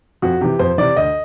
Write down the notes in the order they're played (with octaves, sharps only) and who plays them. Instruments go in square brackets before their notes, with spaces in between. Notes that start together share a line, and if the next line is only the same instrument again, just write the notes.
[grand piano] F2 F#4
C3 E3 G4
F2 C5
C3 E3 D5
D2 D#5